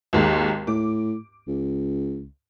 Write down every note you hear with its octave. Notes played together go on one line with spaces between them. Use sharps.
G#1 D#2 G#2
A2 D6
C#2